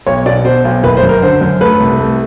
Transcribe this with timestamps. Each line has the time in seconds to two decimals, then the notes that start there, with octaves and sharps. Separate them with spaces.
0.07 B1 C#5
0.26 B2 D5
0.45 B2 C5
0.65 B1
0.83 F#1 B4
0.97 C5
1.03 F#2
1.09 A#4
1.22 D3 C5
1.41 F#2
1.61 A3 B4
1.80 C2
1.99 A3